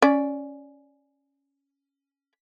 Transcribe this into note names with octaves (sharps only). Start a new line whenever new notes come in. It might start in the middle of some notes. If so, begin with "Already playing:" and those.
C#4 D5